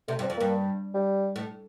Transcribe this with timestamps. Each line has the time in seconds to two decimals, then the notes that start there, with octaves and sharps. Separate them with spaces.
0.08 C3 A3
0.19 G2
0.23 C4
0.30 F2
0.37 G2 A#3
0.94 G3
1.36 A2